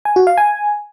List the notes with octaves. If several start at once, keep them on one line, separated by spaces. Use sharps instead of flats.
G#5
F#4
F5
G#5